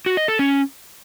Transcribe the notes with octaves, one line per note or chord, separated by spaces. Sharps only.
F#4
D#5
A4
C#4